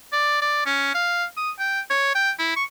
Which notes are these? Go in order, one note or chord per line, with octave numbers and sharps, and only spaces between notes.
D5
D5
C#4
F5
D#6
G5
C#5
G5
E4
C#6